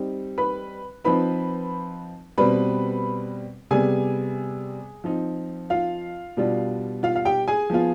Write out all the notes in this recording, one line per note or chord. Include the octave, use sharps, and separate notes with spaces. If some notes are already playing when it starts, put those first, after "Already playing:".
Already playing: G3 C4 D#4
B4 B5
F3 C4 D#4 B4 B5
B2 G3 C4 B4 B5
C3 G3 B3 G#4 G#5
F3 C4 D#4
F4 F5
B2 G3 D4 F4
F4 F5
F5
G4 G5
G#4 G#5
F3 B3 F4